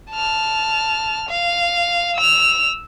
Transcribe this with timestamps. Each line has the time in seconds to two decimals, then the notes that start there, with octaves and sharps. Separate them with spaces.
0.11 A5 F6
1.29 F5
2.16 E6 F7